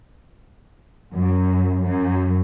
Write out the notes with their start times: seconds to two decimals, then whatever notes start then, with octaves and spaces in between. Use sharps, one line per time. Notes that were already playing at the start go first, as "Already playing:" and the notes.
1.13 F#2
1.84 F#2